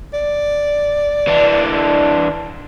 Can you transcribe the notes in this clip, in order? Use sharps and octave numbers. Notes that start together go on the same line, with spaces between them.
D5
E3 D4